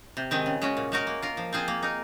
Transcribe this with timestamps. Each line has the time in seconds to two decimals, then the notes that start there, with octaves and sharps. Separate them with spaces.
0.17 C3
0.31 D#3 G#3 C4
0.46 C#3
0.62 G#3 C#4 F#4
0.77 A#2
0.92 G#3 D#4 F#4 A#4
1.07 A#3
1.22 F4 A#4
1.37 F3
1.53 C4 F4 G#4 C5
1.68 A#3
1.83 D#4 A#4